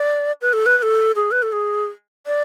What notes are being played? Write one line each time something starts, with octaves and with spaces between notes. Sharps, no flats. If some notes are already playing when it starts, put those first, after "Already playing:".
Already playing: D5
B4
A4
B4
B4
A4
G#4
B4
A4
G#4
D5